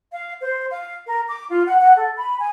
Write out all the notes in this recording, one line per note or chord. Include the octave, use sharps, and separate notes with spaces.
F5
C5
F5
A#4
D6
F4
F#5
F#5
A4
B5
G#5